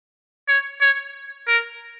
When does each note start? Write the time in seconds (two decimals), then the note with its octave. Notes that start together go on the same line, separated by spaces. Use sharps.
0.48 C#5
0.81 C#5
1.48 A#4